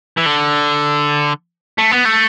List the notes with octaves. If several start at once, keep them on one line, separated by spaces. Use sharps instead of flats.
E3
D3
A3
B3
A3